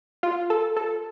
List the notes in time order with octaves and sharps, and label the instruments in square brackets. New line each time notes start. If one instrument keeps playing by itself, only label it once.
[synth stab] F4
A4
A4